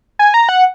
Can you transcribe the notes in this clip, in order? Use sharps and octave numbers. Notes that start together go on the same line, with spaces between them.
G#5
A#5
F#5